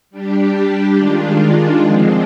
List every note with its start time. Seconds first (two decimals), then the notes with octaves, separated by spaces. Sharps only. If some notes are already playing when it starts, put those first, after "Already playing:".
0.10 G3 D4 G4
0.96 D#3 G#3 D4 F4
1.81 D3 F3 G#3 C4